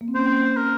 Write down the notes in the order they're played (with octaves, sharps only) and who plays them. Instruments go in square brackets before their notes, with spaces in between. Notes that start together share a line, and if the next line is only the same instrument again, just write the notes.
[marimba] A#3
C4
[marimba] A#3 C#4 [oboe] C5
[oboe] A#4